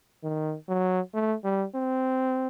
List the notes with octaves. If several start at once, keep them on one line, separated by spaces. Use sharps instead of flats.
D#3
F#3
A3
G3
C4